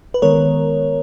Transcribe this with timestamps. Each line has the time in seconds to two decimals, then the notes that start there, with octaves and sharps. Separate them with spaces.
0.14 B4
0.22 D#3 G#3 B3 A#4 C#5